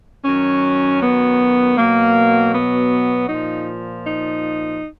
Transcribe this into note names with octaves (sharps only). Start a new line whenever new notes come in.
F#2 D#3 F#3 C#4
B3
B2 F#3 A#3
B3
A#2 F3 D#4
D#4